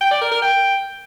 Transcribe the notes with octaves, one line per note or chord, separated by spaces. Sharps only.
G5
D5
A#4
A#4
G5